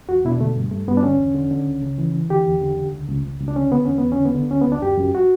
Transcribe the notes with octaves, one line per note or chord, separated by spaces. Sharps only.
E2 F#4
B2 E4
D4
D3 A3
G2
G2 A3
G2 B3
D4
D3 C#4
E2
D3
D3
C#2
C#3
E3
E3
D3 G4
E2
D3
D3
C#2
C#2
C#2
C#2
D4
D3 C#4
D3 B3
E2 C#4
B3
E2
C#4
D3
B3
D3
D2 C#4
B3
D2
D4
F#2 G4
F#2
F#4